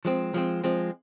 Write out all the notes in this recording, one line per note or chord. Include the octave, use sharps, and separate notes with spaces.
F3 G#3 C4
F3 G#3 C4
F3 G#3 C4